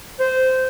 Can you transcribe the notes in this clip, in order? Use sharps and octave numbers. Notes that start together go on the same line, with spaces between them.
C5